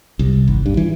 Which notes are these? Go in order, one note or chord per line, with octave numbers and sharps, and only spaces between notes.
C2
G#1
G2
E3